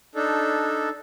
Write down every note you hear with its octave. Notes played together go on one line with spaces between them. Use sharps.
D4 D#4 A4